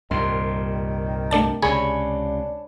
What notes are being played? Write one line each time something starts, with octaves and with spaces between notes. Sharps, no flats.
C2 G2 A#2 D#3 C6
A3 D4 A5
C#2 C3 D4 G#4 C#5 G#5 B5